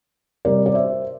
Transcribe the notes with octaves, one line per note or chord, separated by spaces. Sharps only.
C3 G3 A#4 D5
D5
C5 E5